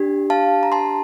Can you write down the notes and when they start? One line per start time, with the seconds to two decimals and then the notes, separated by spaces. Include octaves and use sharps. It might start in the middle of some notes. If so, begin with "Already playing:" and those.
Already playing: D4 G4
0.30 F5 A5
0.63 A#5
0.72 A5 C6